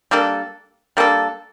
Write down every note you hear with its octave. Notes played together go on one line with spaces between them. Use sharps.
G3 A#3 D4 A4
G3 A#3 D4 A4